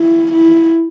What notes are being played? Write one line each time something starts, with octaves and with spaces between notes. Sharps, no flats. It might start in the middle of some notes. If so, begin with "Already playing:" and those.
Already playing: E4
E4